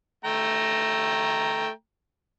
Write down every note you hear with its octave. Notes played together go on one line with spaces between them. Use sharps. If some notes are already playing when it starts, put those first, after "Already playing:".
A3 G5 A#5